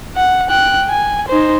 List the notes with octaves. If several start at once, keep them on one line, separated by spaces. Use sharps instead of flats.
F#5
G5 F#6
G#5
D#4 C5